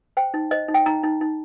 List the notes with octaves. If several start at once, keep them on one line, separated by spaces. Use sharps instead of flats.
C5 G5
D#4
C5 D#5
D#4
G5
D#4 A#5
D#4
D#4